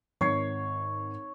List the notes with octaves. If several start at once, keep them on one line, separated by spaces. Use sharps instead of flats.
G#1 G#2 C#5 C7